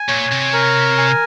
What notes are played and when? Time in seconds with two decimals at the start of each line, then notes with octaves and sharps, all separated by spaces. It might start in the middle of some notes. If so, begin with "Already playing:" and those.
Already playing: G#5
0.08 A#2 C#5
0.31 C3
0.53 A#4
0.98 G#5